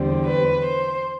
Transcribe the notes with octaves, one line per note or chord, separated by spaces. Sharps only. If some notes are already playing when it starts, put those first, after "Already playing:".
Already playing: E2 D3 G3 C4
B4
C5